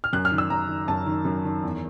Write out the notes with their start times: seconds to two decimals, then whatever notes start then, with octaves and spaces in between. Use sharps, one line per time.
0.04 F6
0.13 F#2 F#6
0.25 F6
0.32 D#3
0.38 E6
0.50 F#2 A#5
0.69 D#3
0.88 F#2 A5
1.06 D#3
1.25 F#2
1.44 D#3
1.63 E2